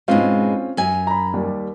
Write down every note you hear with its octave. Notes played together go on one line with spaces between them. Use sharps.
G#2 B2 G#3 C4 C#4 F4
F#2 G#5
A#5 B5
D#2 G3